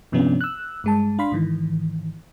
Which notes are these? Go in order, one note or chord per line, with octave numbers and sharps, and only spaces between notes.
G2 C3 F3 B3 C#4 D4
E6 F#6
G2 G#3 A5
D4 F5 B5 C6 B6
G#2 D#3 E3